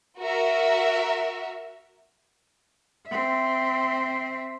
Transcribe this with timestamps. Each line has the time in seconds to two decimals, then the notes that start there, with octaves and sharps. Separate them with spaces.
0.19 F#4 A#4 E5
3.07 C4 E5